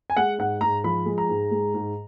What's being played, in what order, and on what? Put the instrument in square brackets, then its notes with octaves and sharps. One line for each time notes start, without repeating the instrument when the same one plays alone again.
[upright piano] G#5
G#3 F#5
G#2 F#5
G#2 A#5
F3 B5
G#3
A#5
G#2
G#3
G#2